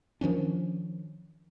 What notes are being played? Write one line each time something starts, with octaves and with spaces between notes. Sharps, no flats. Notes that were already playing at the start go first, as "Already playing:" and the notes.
D#3 F3 C#4 D4